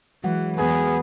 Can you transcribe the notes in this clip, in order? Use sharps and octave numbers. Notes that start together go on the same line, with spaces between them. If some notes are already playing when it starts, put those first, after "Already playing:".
E3 F#3 G#3 F#5
E2 E3 B3 G#4